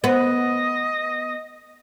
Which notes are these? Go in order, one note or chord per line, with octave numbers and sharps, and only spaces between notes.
B3 D#5